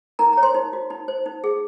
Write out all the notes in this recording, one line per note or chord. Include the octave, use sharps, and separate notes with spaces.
D#4 A#4 A#5
C#5 A#5
C5 C6
D#4
F#4
D#4
C5
D#4
G#4